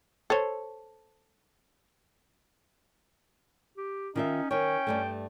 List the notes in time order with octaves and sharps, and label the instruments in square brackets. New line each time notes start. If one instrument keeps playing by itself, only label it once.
[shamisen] A4 C5 C#5
[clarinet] G4
[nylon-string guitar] D#3 F4 E5 [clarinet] C#4 [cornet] D#4
[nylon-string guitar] D#3 C#5 [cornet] C#4 [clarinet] G5
[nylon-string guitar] G2 G3 A3